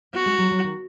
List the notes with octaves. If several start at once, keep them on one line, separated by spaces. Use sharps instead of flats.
B3 F#4
G#3
F#3
F#3
D#3